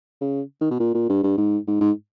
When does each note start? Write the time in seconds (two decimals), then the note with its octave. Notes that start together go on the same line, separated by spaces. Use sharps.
0.21 C#3
0.61 D#3
0.71 B2
0.80 A#2
0.94 A#2
1.09 G2
1.23 G2
1.37 G#2
1.67 G#2
1.81 G#2